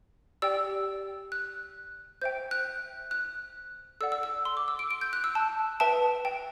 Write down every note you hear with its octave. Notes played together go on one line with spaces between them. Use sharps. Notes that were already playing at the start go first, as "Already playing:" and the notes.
G4 D5 G5 E6
F#6
C5 E5 G5 G6
F#6
F#6
A4 D5 F#5 E6
E6
E6
C6
D6
E6
D7
D7
G6
F#6
E6
A5
B4 E5 G5 A5
G5